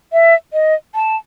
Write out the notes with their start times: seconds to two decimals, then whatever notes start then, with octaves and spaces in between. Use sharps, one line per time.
0.12 E5
0.53 D#5
0.95 A5